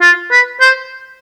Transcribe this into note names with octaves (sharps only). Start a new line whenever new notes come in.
F4
B4
C5